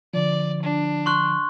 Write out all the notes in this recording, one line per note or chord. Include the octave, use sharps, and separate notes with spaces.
D3 F3 D5
D4
C6 C#6 F#6